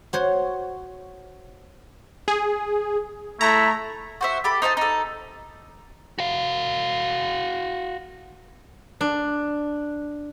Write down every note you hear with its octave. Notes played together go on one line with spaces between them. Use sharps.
F#4 C5 C#5
G#4
A3 E4 A#5
F#4 C5 E5
G4 A4 B5
D#4 C5 E5 A5
D#4 A4
F#4 F5
D4